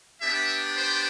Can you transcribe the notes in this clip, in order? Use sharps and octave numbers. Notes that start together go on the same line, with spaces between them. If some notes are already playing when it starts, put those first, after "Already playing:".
B3 D4 G4 E5
C5